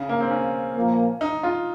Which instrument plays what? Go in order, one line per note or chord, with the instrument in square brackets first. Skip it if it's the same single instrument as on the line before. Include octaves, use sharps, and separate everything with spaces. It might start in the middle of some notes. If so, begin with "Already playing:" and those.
Already playing: [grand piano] C#3
A#3
C4
C#4
[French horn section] A#2 F3 A#3
[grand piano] D#4
F4